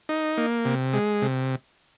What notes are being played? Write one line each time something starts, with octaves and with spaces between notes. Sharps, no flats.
D#4
A#3
C3
G#3
C3